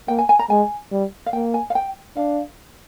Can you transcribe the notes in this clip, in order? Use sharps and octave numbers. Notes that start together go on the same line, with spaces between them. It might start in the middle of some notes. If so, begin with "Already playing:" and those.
A#3 G5
G#5
G#5
A#5
G#3 G#5
G3
F5
A#3 G5
G#5
F5
G5
D4 F5